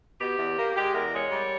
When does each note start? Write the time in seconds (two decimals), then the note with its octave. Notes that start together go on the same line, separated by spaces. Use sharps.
0.19 B2 G4
0.38 E2
0.57 A#3
0.75 G#3 G4
0.94 E2 A#4
1.13 G#3 C#5
1.31 G3